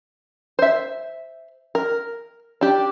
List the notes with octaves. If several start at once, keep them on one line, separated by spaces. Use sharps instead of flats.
C5 E5
A#4
D4 G4